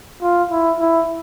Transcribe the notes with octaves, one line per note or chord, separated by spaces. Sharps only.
F4
E4
E4